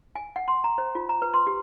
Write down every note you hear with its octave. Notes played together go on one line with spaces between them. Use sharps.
G#5
F#5
C6
A#5
C5
F4
A#5
B4
C6
G4